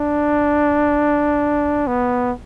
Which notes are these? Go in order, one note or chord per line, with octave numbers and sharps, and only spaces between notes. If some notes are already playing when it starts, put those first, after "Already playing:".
Already playing: D4
B3